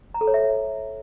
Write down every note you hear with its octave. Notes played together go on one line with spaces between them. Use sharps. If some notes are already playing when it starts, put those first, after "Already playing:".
A#5
A4
C#5
E5